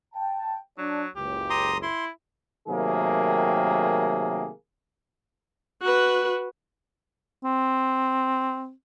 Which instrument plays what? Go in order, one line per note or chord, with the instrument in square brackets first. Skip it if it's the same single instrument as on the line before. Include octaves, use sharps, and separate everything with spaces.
[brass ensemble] G5 A5
[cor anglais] F#3 [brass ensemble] D4
[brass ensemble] F#1 C#2 [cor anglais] G4
[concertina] A#5 C6 D#6
[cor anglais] E4 [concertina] C6
[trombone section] C3 D#3 F#3 A3 A#3 G#4
[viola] F#4 B4
[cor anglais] C4